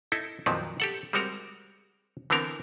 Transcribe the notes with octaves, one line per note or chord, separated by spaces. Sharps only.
D#4 E4 A4
F2 A#2 D#3 F3 F#3 B3
G4 A4 F#5
G3 G#3 C4 F#4 A#4
D3 E3 B3 C4 A#4